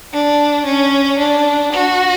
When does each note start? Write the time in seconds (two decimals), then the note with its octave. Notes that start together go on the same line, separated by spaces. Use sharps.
0.13 D4
0.66 C#4
1.19 D4
1.73 F#4